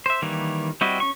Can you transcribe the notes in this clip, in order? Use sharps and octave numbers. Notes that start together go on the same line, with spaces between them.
C5 E5
D#3 E3 G3 A#3
G3 C4 E4 F#4 D#5
C#4 C#6